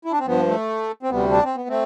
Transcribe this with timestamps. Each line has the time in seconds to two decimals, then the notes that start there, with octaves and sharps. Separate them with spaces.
0.05 E4
0.12 D4
0.19 C4
0.26 G2 F3 B3
0.48 A3
1.03 C4
1.10 D2 C3 G3 B3
1.31 D4
1.43 C4
1.56 B3
1.69 A3 C4